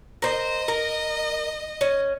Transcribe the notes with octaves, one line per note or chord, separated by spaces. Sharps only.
A#4 C5 D#5
A#4
C#4